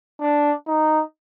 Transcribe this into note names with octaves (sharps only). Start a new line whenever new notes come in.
D4
D#4